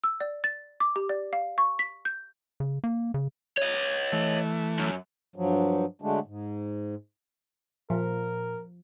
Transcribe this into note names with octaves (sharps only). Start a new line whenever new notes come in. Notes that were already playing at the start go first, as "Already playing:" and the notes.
E6
D5
A6
D6
G4
D5
F5
C#6
B6
G6
C#3
A#3
C#3
C#5 D#5
E3 A3
F#2
G2 F3 F#3
D3 F#3 G#3 A3 D4
G#2
A#2 F3 A#4